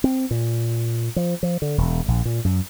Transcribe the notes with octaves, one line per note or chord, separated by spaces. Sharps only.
C4
A#2
F3
F3
D3
E1
A#1
A#2
F#2